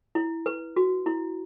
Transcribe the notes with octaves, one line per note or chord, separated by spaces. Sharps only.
E4
B4
F#4
E4